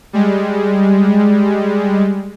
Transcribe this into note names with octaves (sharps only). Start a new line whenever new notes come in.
G3 G#3